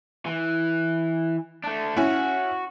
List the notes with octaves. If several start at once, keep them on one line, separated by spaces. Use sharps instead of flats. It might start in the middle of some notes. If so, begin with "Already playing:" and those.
E3
A3 D4
C#4 E4 F#4